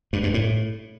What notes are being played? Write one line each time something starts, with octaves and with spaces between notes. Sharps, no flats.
G2
G2
A2